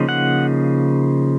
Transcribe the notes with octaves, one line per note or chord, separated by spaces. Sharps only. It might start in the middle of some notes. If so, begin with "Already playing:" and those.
Already playing: C#3 F3 A#3 D#4
F#5